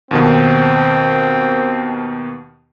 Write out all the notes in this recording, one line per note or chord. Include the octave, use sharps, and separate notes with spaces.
D#2 B2 D#3 C4